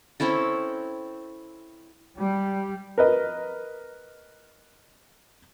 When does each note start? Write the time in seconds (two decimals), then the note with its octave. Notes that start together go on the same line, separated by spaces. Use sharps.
0.20 C4 C#4 E4 A4
2.16 G3
2.98 A#4 B4 D#5